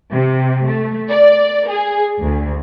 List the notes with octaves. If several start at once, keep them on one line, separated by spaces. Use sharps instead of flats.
C3
A3
D5
G#4
D2